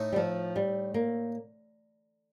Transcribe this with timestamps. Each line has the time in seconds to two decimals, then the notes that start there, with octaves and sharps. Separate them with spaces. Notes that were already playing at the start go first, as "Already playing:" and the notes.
Already playing: A2 A3 D#4
0.12 G3
0.16 F3
0.56 G3
0.94 A#3